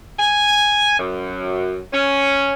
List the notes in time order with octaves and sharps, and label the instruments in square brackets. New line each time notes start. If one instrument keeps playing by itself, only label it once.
[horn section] G#5
F#2
C#4